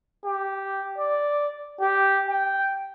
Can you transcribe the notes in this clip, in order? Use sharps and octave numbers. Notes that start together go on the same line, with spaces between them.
G4
D5
G4
G5